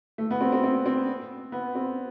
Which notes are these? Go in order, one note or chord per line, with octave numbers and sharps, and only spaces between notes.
A3
B3
C4
C4
C4
C4
B3
C4